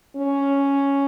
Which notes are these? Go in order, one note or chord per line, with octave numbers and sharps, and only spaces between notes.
C#4